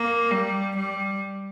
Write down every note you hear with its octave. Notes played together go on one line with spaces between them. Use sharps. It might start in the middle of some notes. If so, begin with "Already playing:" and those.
Already playing: A#3
G3
G3